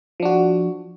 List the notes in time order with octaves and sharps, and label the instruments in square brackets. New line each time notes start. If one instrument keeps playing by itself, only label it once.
[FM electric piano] F3
D4
F#4